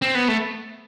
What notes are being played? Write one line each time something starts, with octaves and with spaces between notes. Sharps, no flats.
C4
B3
A3